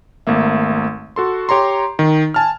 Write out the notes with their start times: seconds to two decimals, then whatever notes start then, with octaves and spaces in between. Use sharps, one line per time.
0.27 G#1 A3 A#3 E5
1.16 F#4 A4 C6
1.49 G4 C#5 A#5 C6
1.99 D#3
2.34 G#5 A5 F6